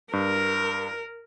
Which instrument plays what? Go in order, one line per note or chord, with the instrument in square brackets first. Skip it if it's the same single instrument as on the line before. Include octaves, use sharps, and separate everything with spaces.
[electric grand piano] G2 [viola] A#4